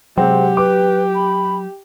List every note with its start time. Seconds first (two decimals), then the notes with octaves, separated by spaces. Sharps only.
0.18 C3 F#3 G#3 C4 G4 F#5
0.57 B4 D6
1.15 B5